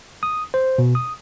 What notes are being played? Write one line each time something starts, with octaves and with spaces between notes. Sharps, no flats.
D#6
C5
B2
D#6